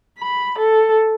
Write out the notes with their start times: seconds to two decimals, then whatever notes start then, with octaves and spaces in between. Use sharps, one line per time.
0.19 B5
0.59 A4